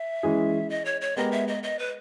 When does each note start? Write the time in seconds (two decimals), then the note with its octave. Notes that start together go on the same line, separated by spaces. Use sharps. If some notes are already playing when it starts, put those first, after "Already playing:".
Already playing: E5
0.23 E3 G#3 C#4 G#4
0.70 D#5
0.85 C#5
1.01 C#5
1.16 G#3 B3 G4 A#4 D#5
1.32 E5
1.48 D#5
1.63 D#5
1.79 B4